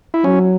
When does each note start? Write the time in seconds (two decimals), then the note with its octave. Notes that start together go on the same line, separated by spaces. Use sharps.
0.14 E4
0.24 F#3 C#4